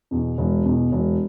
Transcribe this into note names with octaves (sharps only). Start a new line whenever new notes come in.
E2 B2
E1
E2 B2
E1